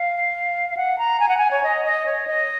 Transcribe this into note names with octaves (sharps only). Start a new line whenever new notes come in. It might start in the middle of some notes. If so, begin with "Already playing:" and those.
Already playing: F5
F5
F#5
A#5
G#5
F#5
G#5
C#5
D#5
D#5
C#5
D#5